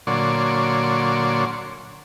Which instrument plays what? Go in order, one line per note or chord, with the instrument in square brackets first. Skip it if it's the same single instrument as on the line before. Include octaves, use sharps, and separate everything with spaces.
[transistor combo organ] A#2 D3 F#3 C#5 D5 C6